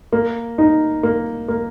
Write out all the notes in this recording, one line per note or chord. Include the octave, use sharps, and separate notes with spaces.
A#3
D#4
A#3
A#3